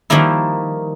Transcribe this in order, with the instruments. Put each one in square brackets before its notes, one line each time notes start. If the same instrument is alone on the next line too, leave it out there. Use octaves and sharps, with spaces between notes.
[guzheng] D#3 F3 G3 A#3 E4